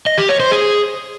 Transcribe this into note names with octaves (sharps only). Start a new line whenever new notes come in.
D#5
G4
C#5
C5
G#4